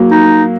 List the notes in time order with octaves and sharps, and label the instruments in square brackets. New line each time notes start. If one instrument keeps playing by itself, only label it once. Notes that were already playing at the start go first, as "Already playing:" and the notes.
Already playing: [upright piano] F#3 A#3
[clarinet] D#4